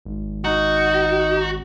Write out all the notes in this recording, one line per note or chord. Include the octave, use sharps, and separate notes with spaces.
G#1
D#4 F#4